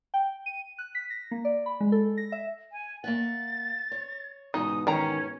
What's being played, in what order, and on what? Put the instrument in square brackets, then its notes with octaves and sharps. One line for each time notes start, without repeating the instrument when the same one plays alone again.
[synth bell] G5
D#7
F#6
B6
A#6
A#3
D5
B5
G#3
A4
A#6
E5
[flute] G#5
[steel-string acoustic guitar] A#3 E5 F#5 [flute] A6
[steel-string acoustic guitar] C#5
[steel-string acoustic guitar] E2 G#2 B2 [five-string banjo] D#4 [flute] D#6
[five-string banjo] D#3 A#5 [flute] C#4